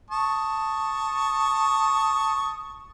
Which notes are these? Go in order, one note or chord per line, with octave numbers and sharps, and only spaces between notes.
A5 C#6 D#6